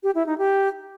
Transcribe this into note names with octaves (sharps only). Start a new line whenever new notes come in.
G4
E4
D#4
G4